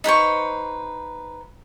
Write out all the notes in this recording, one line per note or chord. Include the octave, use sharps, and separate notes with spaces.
D#4 B4 C5 C#6